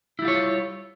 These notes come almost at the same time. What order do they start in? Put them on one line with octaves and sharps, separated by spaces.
E4 G3 F4 C#5